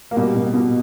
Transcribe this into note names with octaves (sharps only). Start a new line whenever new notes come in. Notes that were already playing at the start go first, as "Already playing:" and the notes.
A#3
B2 G3
B2
B2